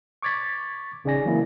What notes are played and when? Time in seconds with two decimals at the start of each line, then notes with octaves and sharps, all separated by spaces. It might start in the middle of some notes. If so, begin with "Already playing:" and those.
0.22 C#6 D6 G#6 A6 B6
1.04 A1 C#3 D#4 D5 G#5 A#6
1.25 E3 F#3 A#3 C4 E4